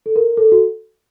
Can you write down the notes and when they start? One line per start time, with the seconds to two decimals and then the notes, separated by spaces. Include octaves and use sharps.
0.06 A4
0.16 A#4
0.37 A4
0.52 F#4